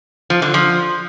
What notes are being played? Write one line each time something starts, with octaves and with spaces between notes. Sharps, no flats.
F3
D3
F3